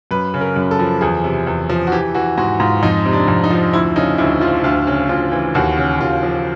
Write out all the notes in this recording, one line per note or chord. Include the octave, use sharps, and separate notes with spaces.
F#2 B4
C#3
A#4
F#2
A4
F3
E2 G#4
C3
E2
F3
F#4
E3 G4
E3 F#4
G#2 F#4
G#2 F4
F2 D#4
C3
D4
F2
D#4
F3
D2 E4
C#3 D#4
D2 E4
F3 F4
D2 F4
C#3
D2 F4
E3
D#2 F#4
C#3
D#2 F4
F3